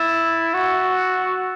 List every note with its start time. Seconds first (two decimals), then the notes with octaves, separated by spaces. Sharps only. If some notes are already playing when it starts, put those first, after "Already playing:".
Already playing: E4 E6 A6 E7
0.54 F#4